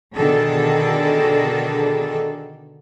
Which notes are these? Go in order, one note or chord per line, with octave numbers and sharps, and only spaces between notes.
B2 D3 D#3 D4 G#4 A4